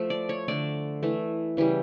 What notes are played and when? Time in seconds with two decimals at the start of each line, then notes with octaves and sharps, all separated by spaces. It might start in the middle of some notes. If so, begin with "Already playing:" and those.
Already playing: F3 A3
0.10 D5
0.29 C#5
0.48 D3 A3 D5
1.03 E3 A3
1.57 C#3 E3 G3